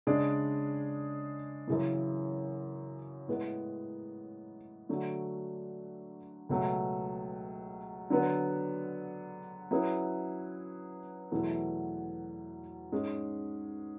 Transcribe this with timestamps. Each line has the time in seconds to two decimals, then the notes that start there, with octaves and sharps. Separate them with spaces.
0.07 C#3 G#3 D4 G#4 D5
1.67 F#2 C#3 E3
3.28 A2 G#3 B3
4.89 D3 F#3 A3 D4 F#4
6.49 C#2 B2 F#3 A3
8.10 D3 F#3 B3
9.71 F#3 C#4 E4 G#4 B4
11.31 E2 B2 F#3 A3 E4
12.92 G#2 G#3 C#4 G#4